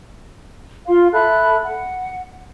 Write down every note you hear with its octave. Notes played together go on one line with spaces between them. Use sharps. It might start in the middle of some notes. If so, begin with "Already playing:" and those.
F4 F5 C6
A4 E5 B5 F#6
F#5